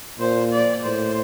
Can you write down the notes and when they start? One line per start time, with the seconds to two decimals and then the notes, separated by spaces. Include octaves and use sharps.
0.19 A#2 C5
0.51 D5
0.83 A2 C5